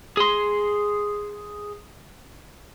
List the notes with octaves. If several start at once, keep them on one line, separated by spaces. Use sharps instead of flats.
G#4 C6